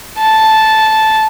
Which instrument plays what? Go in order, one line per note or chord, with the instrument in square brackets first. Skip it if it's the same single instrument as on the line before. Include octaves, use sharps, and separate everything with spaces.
[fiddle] A5